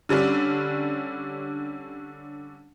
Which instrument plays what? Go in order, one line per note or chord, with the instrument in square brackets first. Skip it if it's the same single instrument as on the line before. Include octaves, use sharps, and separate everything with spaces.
[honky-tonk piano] D3 G3 C#4 D4